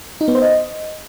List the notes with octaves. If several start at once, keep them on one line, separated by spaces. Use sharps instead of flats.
D#4
B3
C5
D#5